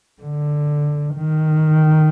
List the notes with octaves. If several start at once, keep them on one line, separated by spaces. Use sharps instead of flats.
D3
D#3